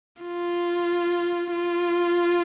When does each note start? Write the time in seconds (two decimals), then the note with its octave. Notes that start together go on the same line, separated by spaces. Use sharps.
0.22 F4
1.52 F4